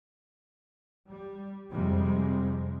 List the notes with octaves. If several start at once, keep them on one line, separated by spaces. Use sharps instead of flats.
G3
F2 C3 G3 G#3